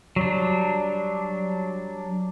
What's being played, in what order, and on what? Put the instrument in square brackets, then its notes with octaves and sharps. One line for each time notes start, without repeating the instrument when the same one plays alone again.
[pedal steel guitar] F#3 G3 D4